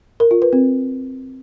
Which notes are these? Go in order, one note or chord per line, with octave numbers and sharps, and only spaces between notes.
A#4
F4
B4
C4